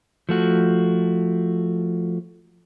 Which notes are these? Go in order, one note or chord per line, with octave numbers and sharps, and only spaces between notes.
F3 A3 F#4